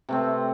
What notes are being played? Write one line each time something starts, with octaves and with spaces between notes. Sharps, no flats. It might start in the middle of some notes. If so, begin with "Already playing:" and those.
C3 A3 C4